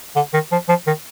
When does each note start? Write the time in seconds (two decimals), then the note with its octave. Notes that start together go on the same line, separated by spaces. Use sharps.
0.16 D3
0.34 D#3
0.52 F3
0.69 F3
0.87 D#3